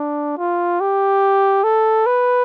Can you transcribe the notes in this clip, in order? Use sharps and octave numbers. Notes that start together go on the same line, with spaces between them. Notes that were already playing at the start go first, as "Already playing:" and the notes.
Already playing: D4
F4
G4
A4
B4